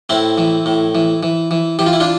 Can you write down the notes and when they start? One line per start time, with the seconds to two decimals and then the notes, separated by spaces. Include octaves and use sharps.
0.09 A2 C4 E4
0.38 E3
0.66 A2
0.95 E3
1.23 E3
1.51 E3
1.79 E3 G4
1.86 F4
1.93 E4
2.00 D4 F4